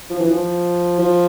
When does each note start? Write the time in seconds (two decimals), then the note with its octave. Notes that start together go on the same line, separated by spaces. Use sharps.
0.10 F3
0.20 E3
0.30 F3
0.99 F3